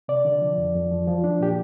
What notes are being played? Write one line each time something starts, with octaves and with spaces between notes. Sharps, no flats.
C3 D5
D3
F3
F2
F2
F3
F3
F3 D4
A#2 G4